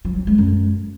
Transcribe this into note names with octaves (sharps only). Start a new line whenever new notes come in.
F3
F#3
G#3
F#2